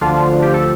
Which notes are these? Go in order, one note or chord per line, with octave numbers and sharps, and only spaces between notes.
D2 D3 F3 D4 F4
G4
A4